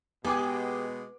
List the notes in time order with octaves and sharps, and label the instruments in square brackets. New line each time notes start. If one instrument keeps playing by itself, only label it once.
[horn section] B2 G#3 [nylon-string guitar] B3 [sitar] G4 G#4 [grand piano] G#5 D6